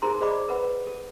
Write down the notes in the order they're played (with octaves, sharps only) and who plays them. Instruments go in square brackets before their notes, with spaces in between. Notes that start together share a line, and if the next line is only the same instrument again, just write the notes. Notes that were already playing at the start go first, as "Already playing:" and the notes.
[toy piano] D#4 G#4 A#4 C5 A#5 C6
G#4 C5 D5 D#5 B5 D6
A#4 B4 F#5 B5
A4